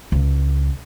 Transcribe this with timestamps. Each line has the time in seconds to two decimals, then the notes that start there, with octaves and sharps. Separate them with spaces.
0.12 C#2